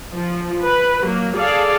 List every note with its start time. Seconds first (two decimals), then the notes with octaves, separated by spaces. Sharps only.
0.14 F3
0.64 B4
1.03 F#3 A#3
1.37 G#4 A4 D5 F5